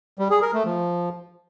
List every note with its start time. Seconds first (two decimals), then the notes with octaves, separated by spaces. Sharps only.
0.19 G3
0.31 G#4
0.42 A#4
0.54 A3
0.65 F3